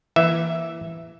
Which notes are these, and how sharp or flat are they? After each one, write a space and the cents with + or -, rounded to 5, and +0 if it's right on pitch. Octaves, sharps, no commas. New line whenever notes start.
E3 +15 A#3 +15 E5 +0